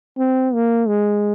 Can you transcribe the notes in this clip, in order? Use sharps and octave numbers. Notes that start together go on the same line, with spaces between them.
C4
A#3
G#3